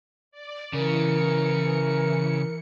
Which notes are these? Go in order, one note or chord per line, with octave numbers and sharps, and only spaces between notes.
D5
C#3 E3 A#4 C#7